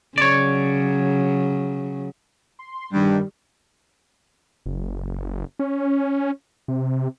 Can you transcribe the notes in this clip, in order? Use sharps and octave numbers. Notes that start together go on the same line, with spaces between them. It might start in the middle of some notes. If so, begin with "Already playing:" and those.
C#3 F#3 C#5 D5
C6
G2 D#3 G3
F#1
C#4
C3